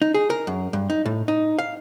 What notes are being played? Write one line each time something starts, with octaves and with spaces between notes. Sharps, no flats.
D#4
G#4
A#4
F#2
G2
D#4
A2
D#4
F5